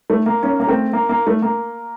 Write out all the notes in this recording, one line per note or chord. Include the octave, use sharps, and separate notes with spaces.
A3
A#3
A#3 C#4
A#3
A3 C4
A#3
A#3
A3
A#3